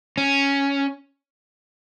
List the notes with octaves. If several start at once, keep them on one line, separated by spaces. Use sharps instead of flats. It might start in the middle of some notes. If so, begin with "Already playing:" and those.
C#4